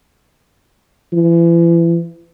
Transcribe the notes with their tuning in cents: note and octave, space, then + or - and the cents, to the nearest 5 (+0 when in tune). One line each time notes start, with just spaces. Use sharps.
E3 +35